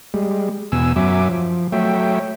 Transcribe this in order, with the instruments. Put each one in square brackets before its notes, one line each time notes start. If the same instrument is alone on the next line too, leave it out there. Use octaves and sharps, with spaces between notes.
[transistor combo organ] G3 G#3
E2 B2 G#5 E6
F#2 F#3 E5 G#5 D6
F3
F#3 A3 C#5 E5 G5